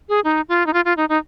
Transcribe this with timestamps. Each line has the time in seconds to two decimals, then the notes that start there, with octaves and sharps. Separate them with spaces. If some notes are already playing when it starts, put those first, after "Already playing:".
0.09 G#4
0.24 D#4
0.49 F4
0.67 D#4
0.73 F4
0.85 F4
0.97 D#4
1.09 D#4